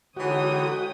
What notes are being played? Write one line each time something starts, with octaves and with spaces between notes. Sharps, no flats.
D3 E3 G#3 D#4 F#4 C#5 G5 D#6